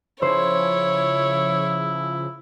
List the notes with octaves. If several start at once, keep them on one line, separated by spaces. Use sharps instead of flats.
C#3 F3 E4 C5 C#5